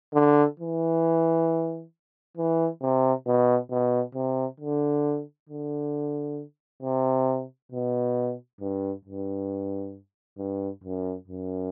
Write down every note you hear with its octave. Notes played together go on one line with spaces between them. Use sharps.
D3
E3
E3
C3
B2
B2
C3
D3
D3
C3
B2
G2
G2
G2
F#2
F#2